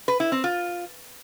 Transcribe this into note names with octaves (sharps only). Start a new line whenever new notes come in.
B4
E4
C4
F4